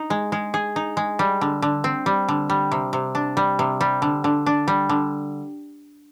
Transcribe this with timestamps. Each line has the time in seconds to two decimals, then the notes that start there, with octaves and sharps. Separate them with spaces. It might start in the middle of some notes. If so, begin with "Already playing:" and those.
Already playing: D#4
0.10 G#3
0.32 G#3
0.54 G#4
0.76 D#4
0.97 G#3
1.19 G3
1.41 D3
1.62 D3
1.84 C4
2.06 G3
2.28 D3
2.50 G3
2.71 C3
2.93 C3
3.15 D4
3.37 G3
3.59 C3
3.81 G3
4.02 D3
4.24 D3
4.46 D4
4.68 G3
4.89 D3